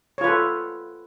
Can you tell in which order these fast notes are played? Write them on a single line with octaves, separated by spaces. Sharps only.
C#5 F4 B4 A4